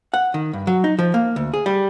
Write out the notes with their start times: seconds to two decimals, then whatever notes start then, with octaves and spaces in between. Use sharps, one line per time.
0.14 F#5
0.34 D#3
0.53 G2
0.67 F#3
0.84 D#4
0.99 F3
1.14 A#3
1.36 D2
1.54 G#4
1.66 G3